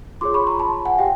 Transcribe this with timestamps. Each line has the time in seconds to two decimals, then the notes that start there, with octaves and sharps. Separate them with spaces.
0.21 F4 G#4 C#5 C6 D6
0.34 B5 C#6
0.47 A#5 C6
0.59 A5 B5
0.85 F#5 G#5
0.98 G4 F5 G5